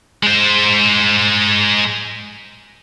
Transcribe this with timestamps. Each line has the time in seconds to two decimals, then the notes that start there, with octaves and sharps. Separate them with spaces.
0.23 G#3 C5